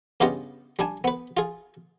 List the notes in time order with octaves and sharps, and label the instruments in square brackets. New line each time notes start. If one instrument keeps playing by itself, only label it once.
[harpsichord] G2 C#3 B3 F4 G4 D#5
G3 D4 G#5
B3 B4
F4 G#4